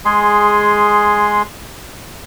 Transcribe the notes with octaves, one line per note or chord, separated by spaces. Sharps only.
G#3 G#4 C6